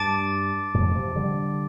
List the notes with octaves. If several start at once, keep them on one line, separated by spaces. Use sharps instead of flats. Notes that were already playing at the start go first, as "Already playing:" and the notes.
Already playing: G2 A5 D6 A6 D7
F2 A2
C3 F3
D3 G3